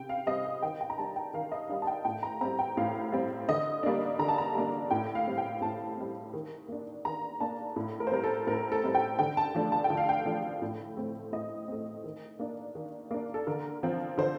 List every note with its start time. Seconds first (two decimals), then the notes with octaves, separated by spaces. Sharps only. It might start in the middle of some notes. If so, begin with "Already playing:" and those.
Already playing: C3 G5
0.09 F5
0.27 G3 C4 D#5
0.45 F5
0.62 D#3 G5
0.81 G5
0.90 A#5
0.98 G3 D4 A5
1.16 G5
1.34 D#3 F5
1.52 D#5
1.69 G3 D4 F5
1.82 A5
1.87 G5
2.05 A2 G5
2.23 A#5
2.41 G3 C4 A#5
2.59 G5
2.77 A2 F5
3.12 G3 C4
3.49 D3 D#5
3.83 G3 A#3 D4
4.19 D3 A#5
4.28 A5
4.38 A#5
4.55 G3 A#3 D4
4.91 A2 G5
5.15 F5
5.27 G3 C4
5.38 G5
5.61 A2 A5
5.97 G3 C4
6.33 D#3
6.68 A#3 D4
7.05 D#3 A#5
7.40 A#3 D4 A5
7.76 A2
8.00 A#4
8.07 C5
8.11 G3 C4 A#4
8.24 A4
8.47 A2 A#4
8.72 A4
8.84 G3 C4
8.95 G5
9.19 D3 G5
9.37 A5
9.55 F3 A3 D4
9.72 A5
9.84 G5
9.90 D3
9.97 F5
10.09 G5
10.25 F3 A3 D4
10.62 A2
10.97 A3 C4
11.32 A2 D#5
11.68 A3 C4
12.04 D#3
12.39 A#3 D4
12.75 D#3
13.11 A#3 D4
13.34 A4
13.47 D3 A#4
13.83 F3 C4
14.18 D3 C5